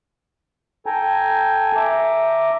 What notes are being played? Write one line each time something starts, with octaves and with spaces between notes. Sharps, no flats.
A4 G5 G#5 A#5
E5 A#5 D6